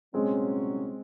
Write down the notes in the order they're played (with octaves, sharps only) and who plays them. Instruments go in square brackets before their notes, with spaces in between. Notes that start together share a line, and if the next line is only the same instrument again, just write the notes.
[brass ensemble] C2 A#2 F#3 C#4 [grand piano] G#3 C4